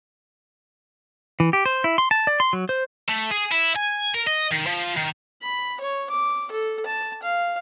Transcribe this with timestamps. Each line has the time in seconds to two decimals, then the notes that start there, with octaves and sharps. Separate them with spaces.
1.40 E3
1.53 G4
1.65 C5
1.84 E4
1.98 C6
2.11 A5
2.27 D5
2.40 C6
2.53 F#3
2.69 C5
3.09 A3
3.31 G#4
3.52 E4
3.76 G#5
4.15 A#4
4.27 D#5
4.52 D#3
4.66 F3
4.96 D#3
5.42 B5
5.81 C#5
6.11 D6
6.51 A4
6.86 A5
7.23 F5